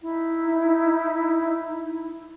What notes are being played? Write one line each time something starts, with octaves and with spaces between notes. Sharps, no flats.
D#4 E4